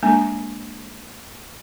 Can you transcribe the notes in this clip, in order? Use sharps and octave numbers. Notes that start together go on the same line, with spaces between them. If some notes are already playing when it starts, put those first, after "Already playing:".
G#3 A#3 D4 G#5